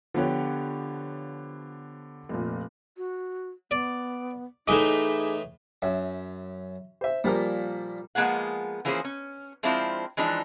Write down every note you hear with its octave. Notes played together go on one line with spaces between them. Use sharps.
D3 F3 B3 G4 C#5
F1 A#2
F#4
B3 D5
A2 E3 D#4 G#4 D#5 D6
F#2 E5
C5 E5
A#2 F3 G3 A#4
F3 G#3 A#3 B3 G#4 F#5
E3 F3 A#3 C#4 G#4 C5
C#4
F3 G#3 C4 D4 E4 F4
E3 F3 G#3 D4 D#4